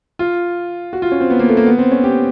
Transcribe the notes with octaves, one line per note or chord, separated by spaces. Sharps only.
F4
F#4
F4
C#4
C4
B3
A#3
A3
A#3
B3
C4
C#4
G4